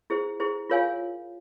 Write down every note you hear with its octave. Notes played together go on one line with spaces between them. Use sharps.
E4 G#4 C5
E4 G#4 C5
F4 A#4 C#5 F5 G#5